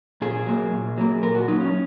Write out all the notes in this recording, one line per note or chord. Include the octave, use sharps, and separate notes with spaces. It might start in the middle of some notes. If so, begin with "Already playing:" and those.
A#2 G#4
F#3 A#3
A#2
F#3 A#3
A#2 A#4
F#4
F#3 A#3 D#4
C#4